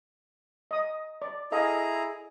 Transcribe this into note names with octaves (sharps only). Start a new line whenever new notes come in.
D#5 D#6
D5
E4 G#4 A4 D#5 F5 A#5